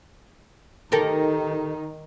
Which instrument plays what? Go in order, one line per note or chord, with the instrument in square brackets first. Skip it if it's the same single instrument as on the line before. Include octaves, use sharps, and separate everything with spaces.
[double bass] D#3 D#4 [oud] G4 A4 A#4